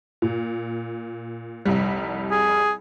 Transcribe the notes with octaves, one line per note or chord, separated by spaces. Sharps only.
A#2
F1 C2 G3
G#4